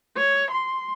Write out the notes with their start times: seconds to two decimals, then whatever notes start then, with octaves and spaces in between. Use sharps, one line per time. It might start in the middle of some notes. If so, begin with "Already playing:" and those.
0.17 C#5
0.51 C6